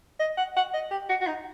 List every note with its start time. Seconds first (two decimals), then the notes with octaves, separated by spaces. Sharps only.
0.20 D#5
0.37 F#5
0.56 F#5
0.74 D#5
0.91 G4
1.09 F#4
1.21 F#4
1.27 D#4